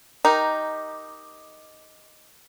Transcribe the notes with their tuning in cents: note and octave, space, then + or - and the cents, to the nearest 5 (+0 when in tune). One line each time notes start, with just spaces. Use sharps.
D#4 +0 G4 +0 A#4 +10